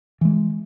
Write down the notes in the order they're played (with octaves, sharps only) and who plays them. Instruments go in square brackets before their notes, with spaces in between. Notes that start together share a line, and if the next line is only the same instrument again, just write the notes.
[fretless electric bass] E3 G#3